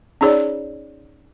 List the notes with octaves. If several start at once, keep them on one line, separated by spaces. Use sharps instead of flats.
C#4 D#4 G#4 C#5 D5